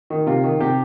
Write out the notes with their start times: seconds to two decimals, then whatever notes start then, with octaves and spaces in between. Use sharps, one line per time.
0.10 D#3
0.26 C3 F4
0.44 D#3
0.60 C3 G4